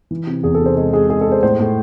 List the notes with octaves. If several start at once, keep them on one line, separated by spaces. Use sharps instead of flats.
E3
C3
E2 G#4
A4
C3
C5
G#3
G#3 G#4
G#3 G#4
A4
G#3
C5
A2 C5
A2